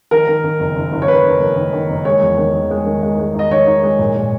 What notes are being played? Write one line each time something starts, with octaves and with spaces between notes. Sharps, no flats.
D#3 A#4
D#3
D#3
F#1
F#1
F#1
C#5
F#1 B4
F#1
F#1
D#3
D#3
F#1
G#3 C#5
E2
D#3
D#3
G#3
D#3
G#3
G#3
D#4 D#5
D#3 C#5
D#4
G#3
A#2
A#2